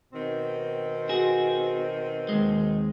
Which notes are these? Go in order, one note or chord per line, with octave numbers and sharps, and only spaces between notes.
B2 D#3 C4
F#4 G#4
D#2 G#3